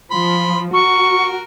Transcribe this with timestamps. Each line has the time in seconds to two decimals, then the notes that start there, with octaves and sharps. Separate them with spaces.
0.11 F3 B5 C6
0.73 F#4 A#4 C#6